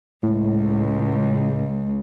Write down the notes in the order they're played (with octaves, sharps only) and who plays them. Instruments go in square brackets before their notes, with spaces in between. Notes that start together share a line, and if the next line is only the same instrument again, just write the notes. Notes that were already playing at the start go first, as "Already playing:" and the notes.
[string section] C#2 [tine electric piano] A2